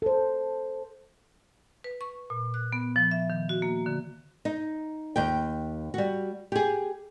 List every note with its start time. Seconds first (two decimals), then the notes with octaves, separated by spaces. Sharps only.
0.02 A4 C5
1.84 B4
2.01 C#6
2.30 A#2
2.54 F#6
2.72 B3
2.96 F3
3.11 E5
3.30 D#3
3.49 F#4
3.62 A#3
3.86 D3
4.45 D#4
5.16 D#2 G5
5.94 G3 F#4
6.52 G4 G#4